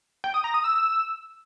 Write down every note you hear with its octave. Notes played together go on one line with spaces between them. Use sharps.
G5
D#6
A#5
D#6
E6